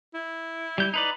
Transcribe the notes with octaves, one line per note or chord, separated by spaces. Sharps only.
E4
G3 G6
D#4 B4 D5